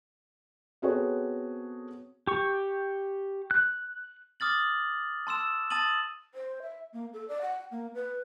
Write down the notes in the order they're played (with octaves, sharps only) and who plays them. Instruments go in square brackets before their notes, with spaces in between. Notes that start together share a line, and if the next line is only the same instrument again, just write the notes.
[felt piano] B3 C4 F#4 G#4 A4 C#5
[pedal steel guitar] G4 C#6
F#6
[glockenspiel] D6 D#6 F6 A6 F#7
A5 C6 E6 E7
A5 D#6 A6 D#7 F#7
[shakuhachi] C5
E5
A#3
A4
D5
F#5
A#3
B4